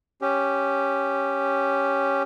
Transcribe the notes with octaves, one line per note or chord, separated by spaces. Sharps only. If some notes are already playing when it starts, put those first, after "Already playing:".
C#4 G4